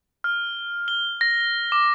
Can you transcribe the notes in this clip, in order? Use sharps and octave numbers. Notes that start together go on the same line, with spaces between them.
F6
G7
A#6
D6